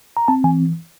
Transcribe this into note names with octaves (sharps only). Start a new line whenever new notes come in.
A#5
C4 A5
E3 G#5